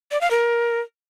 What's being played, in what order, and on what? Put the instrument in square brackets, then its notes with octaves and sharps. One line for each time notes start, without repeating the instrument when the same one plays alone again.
[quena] D5
F5
A#4